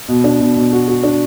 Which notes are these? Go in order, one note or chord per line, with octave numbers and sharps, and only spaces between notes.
B2
D4
B2
B2
F#4
F#4
D4